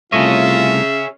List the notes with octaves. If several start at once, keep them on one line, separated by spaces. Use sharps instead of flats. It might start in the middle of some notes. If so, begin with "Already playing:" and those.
C2 A3 F4 G#4 C#5 D#5 E5